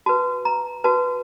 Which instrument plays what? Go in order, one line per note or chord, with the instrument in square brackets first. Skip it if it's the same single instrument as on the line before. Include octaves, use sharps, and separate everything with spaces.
[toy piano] F#4 B4 A5
A#5
F#4 B4 A5